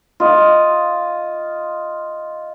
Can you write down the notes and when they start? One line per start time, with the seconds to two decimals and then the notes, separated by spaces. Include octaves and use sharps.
0.20 F4 D#5